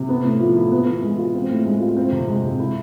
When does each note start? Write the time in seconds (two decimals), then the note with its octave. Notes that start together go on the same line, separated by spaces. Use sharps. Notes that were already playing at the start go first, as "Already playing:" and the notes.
Already playing: C3
0.09 B3
0.24 A2
0.40 F3
0.56 E4
0.72 B3
0.87 E3
1.03 G#3
1.18 F4
1.34 C4
1.50 A2
1.65 G#3
1.81 F4
1.97 C4
2.12 C3
2.28 G#3
2.43 C3
2.59 E4